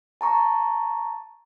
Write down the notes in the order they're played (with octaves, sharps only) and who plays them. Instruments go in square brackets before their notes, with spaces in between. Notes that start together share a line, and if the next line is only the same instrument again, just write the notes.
[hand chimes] A5 A#5 C#6